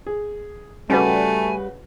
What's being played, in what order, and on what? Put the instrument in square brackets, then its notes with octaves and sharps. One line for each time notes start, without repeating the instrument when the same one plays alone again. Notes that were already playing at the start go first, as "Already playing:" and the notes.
[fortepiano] G#4
[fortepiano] C#3 F#4 B4 [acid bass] G3 [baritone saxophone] A3 [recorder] G#5